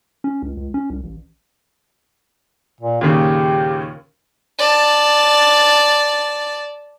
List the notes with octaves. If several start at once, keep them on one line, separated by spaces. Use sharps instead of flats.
C#4
C#2
C#2
C#4
C2
A1
A#2
D#2 A#2 C#3 G4
D5 A5